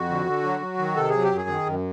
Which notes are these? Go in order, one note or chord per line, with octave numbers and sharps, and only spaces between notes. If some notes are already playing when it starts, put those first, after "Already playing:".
Already playing: F2 F#4
D3
D3
F#3
F#3
D#3
C3 A4
F#3 G#4
G4
F#2
G#4
D#3
F#2